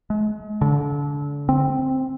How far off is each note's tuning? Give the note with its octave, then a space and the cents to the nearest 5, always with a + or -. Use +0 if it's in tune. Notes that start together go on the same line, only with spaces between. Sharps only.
G#3 +40
D3 -30
C4 +5